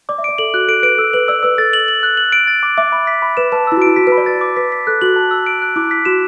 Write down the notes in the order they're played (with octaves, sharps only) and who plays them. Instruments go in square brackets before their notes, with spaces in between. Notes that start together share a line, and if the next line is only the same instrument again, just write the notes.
[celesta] D5 [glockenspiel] D6
[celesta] E5
[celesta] D5 [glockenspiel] D7
[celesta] A4 [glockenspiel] F#7
[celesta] F#4 [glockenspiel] F#6
[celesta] A4 [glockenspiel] D7
[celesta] B4 [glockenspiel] D7
[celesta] A4 [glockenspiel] E6
[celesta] B4 [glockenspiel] F#7
[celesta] D5 [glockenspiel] E6
[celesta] B4 [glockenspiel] E6
[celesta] A4 [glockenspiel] A6
[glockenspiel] F#7
F#7
F#6
F#7
D7
A6
D6
[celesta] E5 [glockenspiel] D6
[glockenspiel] B5
B6
B5
[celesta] B4 [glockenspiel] E7
[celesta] B4 [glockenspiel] A5
[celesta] E4 [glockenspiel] E6
[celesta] F#4
[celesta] E4 [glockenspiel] D7
[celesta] F#4 [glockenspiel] B6
[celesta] B4
[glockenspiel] B5
[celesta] D5
[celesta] B4 [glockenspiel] A6
[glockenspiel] D6
[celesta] B4 [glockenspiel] B6
[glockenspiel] B6
[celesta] A4 [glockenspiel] F#6
[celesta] F#4 [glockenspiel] F#7
[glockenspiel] A5
E6
D7
F#6
[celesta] E4 [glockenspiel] D6
[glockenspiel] B6
[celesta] F#4 [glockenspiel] E7